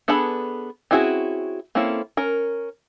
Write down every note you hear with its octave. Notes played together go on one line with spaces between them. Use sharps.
B3 D4 G#4 A4 B5
C4 C#4 E4 F#4 G#4
A#3 C4 C#4 E4 A4
C#4 A#4